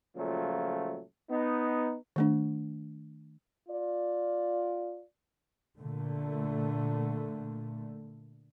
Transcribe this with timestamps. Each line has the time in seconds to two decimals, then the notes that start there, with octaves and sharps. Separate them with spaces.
0.16 A#2 C#3 F3 F#3 A3
1.30 B3 D#4
2.16 D#3 A3 D4
3.69 F4 D5
5.78 A#2 D3 A3